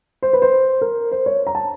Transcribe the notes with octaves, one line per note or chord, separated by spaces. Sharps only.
C5
B4
C5
A#4
C5
C#5
A#5
A5